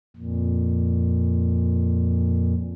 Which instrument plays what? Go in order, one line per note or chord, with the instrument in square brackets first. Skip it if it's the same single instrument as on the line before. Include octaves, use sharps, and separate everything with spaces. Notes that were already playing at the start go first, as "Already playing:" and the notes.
[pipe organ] F2 A#2